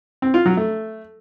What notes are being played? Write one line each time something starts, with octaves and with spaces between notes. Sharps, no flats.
C4
F4
F#3
A3